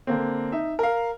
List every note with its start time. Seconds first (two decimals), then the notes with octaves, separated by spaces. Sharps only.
0.07 D3 A#3 C4
0.52 D#4 E5
0.79 A#4 F5